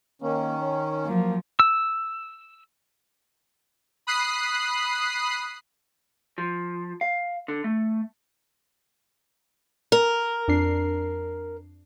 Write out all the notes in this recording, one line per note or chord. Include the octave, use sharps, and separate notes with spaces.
D#3 A#3 C#4
C#5
F3 F#3 A#3
E6
B5 D#6 F#6 C7
F3
F5
D3
A3
A#4
F2 D4 C7